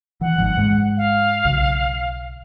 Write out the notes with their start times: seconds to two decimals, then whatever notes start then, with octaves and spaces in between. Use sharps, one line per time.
0.21 E3 F#5
0.38 G#1 G#2 F3
0.57 G#2 G#3
0.97 F5
1.45 B1 C#3